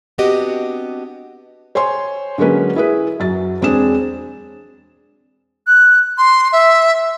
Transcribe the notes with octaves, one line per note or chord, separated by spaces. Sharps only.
B3 C4 D4 F#4 G4 D#5
C5 C#5 G#5 C6
D3 F#3 G#3 A#3 C#4 B4
E4 G#4 B4
F#2 F#3 A6
E1 C4 D4 G#4 E7
F#6
C6
E5